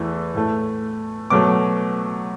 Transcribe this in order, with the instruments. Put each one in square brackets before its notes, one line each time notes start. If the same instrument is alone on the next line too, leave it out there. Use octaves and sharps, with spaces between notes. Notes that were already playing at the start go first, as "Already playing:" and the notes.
Already playing: [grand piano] E2 E3 A3
A2 A3
B2 F#3 A3 D6